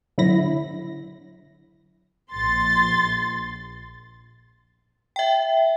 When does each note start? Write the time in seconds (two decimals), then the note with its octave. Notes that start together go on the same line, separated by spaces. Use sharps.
0.18 D3 F#3 E4 B5 A#6
2.32 A#1 C6 A6
5.16 E5 G5